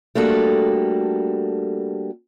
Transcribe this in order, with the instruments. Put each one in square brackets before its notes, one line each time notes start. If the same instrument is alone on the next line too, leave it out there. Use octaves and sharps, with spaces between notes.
[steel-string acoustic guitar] G3 A3 A#3 D4 F#4 A4